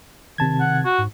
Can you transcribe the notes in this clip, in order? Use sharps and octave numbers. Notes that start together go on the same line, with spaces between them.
C3 D#3 A5 G#6
F#5
F#4
G#2